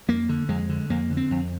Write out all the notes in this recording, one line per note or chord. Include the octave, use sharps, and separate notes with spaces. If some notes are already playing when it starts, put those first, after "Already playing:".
F2 A#3
D3
F2 G#3
D3
F2 A#3
D3
C4
F2